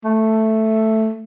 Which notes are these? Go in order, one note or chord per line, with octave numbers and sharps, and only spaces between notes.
A3